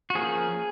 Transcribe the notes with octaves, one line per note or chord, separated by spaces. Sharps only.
F#4
F3 A#3 C#4 G#4